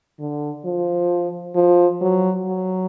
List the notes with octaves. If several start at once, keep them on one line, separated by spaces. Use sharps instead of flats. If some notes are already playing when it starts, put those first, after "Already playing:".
D3
F3
F3
F#3
F#3